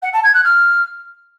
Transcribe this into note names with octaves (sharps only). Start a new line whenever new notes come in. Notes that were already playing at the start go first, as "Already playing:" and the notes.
F#5
A5
G#6
F#6
F6